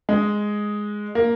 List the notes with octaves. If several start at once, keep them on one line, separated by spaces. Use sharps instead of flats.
G#3
A#3